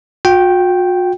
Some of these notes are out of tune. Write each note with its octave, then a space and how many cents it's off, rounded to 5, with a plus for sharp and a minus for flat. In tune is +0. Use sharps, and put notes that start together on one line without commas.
F#4 -45 G5 -5